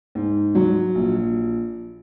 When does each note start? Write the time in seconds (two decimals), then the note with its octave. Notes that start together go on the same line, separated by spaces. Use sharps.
0.15 G#2
0.55 F#3
0.95 A#1